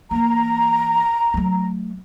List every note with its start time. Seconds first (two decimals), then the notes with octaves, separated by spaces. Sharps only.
0.11 E3 A#3 A#5
1.34 F#3 A3